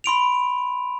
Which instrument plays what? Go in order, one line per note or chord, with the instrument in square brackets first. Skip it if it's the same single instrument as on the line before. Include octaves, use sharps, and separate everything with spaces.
[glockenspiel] B5 C6 D7 F7